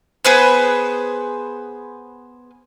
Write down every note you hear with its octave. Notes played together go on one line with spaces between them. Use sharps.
B3 G#4 B4 C5